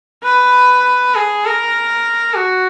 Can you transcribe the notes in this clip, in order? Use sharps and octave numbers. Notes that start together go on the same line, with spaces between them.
B4
G#4
A#4
F#4